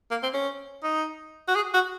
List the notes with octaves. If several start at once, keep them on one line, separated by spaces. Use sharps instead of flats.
A#3
C4
C#4
D#4
F#4
G#4
F#4